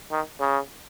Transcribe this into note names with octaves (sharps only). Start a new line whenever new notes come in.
D#3
C#3